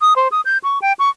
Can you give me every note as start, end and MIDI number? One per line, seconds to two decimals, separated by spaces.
0.01 0.13 87
0.16 0.28 72
0.32 0.41 87
0.45 0.58 91
0.64 0.79 85
0.82 0.93 79
0.99 1.09 85